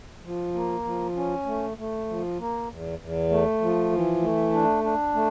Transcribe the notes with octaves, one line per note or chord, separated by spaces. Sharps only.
F3
A#3
F3
C#4
A3
A3
F3
A#3
E2
E2
A3
F3
E3
A3
D4
D4
A3